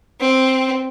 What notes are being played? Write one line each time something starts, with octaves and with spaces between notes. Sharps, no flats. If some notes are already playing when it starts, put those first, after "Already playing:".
C4